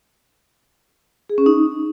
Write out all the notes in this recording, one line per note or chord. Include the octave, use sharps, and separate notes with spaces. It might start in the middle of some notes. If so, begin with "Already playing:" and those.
G#4
C#4
D#4